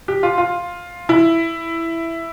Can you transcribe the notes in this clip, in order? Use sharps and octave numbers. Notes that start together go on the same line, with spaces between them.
G4
F4
F4
E4